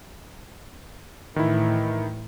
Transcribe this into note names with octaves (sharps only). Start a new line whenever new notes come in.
A2 D#3 E3 E4